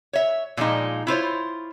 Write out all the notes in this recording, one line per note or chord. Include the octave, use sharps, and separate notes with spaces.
C#5 E5
A#2 F3 G#3 D#4
E4 F4 C5 C#5